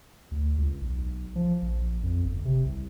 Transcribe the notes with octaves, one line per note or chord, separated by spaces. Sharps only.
D2
C#2
B1
F3
A#1
F2
G1
C3
C2